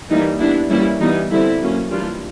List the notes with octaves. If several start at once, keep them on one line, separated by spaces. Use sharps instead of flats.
E3 G3 A#3 D#4
G3 B3 D4 E4
E3 G3 A#3 C#4 E4
E3 G3 B3 D#4
D3 G3 C4 E4
F#3 A#3 C#4
E3 G3 A#3 D4 F4